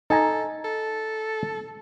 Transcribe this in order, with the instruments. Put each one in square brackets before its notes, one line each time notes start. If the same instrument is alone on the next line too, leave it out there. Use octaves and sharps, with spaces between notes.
[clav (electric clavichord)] D#4 G#5 A#5 [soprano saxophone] A4
[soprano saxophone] A4